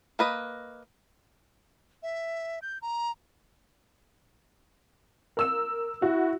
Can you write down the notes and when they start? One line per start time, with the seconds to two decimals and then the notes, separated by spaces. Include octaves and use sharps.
0.19 A#3 B4 D#5
2.03 E5
2.62 G6
2.82 A#5
5.37 A#4 E6 E7
6.02 E4 F#4